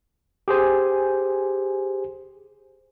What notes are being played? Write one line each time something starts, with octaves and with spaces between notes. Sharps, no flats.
G4 G#4 C5 G#5